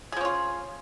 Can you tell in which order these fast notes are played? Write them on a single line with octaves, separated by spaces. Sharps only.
G#4 F3 C#4 F4